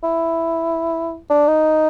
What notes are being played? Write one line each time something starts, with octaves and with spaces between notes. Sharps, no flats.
E4
D4
D#4